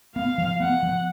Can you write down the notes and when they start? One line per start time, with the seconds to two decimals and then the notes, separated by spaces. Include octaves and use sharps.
0.16 B3 F5
0.38 F3
0.60 B3 F#5
0.83 F3